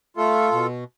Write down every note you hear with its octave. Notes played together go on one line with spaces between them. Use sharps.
A3 F4 A4
B2